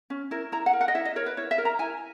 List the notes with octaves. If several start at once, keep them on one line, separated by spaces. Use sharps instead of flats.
C#4
E4 A#4
E4 A#5
F#5
A#4
F#5
D#5
E4 E5
D#5
A#4 C#5
B4
E4 C#5
E5
A#4
A#5
E4 G#5